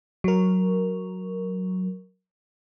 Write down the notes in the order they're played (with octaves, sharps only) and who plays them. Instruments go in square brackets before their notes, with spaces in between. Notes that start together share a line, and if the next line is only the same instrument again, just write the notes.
[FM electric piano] F#3 A#4